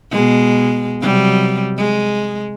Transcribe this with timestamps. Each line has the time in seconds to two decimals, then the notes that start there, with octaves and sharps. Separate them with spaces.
0.12 B2 G#3
1.02 C3 F#3 G3
1.78 G#3